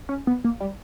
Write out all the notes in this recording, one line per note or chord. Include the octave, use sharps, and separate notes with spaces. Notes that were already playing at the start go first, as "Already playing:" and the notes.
C#4
B3
A#3
G3